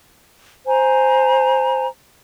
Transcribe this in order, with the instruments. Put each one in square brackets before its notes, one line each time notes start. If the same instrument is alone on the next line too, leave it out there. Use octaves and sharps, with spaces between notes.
[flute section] C5 G#5 A#5